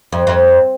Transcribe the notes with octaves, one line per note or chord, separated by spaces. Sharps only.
F2
F2